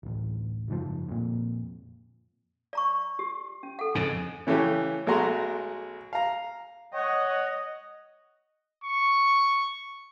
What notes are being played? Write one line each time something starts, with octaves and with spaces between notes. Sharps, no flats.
D1 A1
F#1 G#2 F3
F2 A#2
D5 A#5 C#6
G4
C#4
A4 F#5
F2 G#2 C#3 G#5
C#3 E3 A3 C#4 G4
B1 G#3 A3 F#4 A#5 C6
F5 A#5
C#5 D#5 F#5
C#6